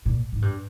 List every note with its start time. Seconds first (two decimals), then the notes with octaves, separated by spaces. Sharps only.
0.05 A#2
0.32 G#2
0.42 G2